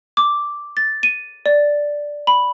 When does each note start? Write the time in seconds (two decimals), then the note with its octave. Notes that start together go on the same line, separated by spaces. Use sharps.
0.17 D6
0.77 A6
1.03 D#7
1.46 D5
2.27 B5